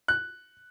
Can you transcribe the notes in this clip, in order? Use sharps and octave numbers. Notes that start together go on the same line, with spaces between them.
F#6